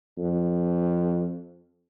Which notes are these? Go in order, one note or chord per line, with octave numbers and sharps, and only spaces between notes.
F2